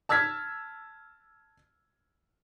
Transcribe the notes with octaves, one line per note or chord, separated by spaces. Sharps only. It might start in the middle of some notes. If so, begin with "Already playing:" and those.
A5 E6 F6 G#6 B6